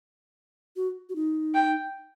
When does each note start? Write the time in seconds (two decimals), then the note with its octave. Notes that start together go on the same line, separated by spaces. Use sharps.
0.76 F#4
1.09 F#4
1.16 D#4
1.55 G5